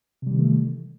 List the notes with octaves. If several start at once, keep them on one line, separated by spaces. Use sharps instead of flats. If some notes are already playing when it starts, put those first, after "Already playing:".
C3 D#3 E3 G3 A3